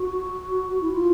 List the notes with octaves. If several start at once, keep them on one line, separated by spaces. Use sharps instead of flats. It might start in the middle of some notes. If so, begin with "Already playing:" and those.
Already playing: F#4
E4
F4